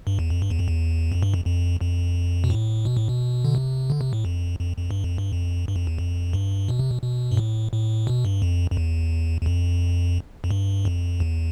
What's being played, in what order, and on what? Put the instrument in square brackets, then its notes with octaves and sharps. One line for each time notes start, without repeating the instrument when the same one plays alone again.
[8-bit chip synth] G2
E2
F2
G2
E2
F2
E2
F2
G2
F2
F2
F2
B2
A2
B2
A2
B2
D3
C3
D3
C3
A2
F2
F2
F2
G2
F2
G2
F2
G2
F2
E2
F2
G2
B2
C3
B2
B2
G2
A2
A2
B2
G2
F2
F2
E2
E2
F2
F2
G2
F2
E2